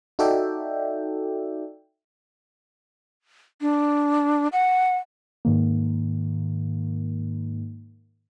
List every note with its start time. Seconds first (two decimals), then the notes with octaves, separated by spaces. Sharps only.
0.19 D#4 F#4 A4 D5 E5 G5
3.61 D4
4.53 F#5
5.45 G#2 D#3 A#3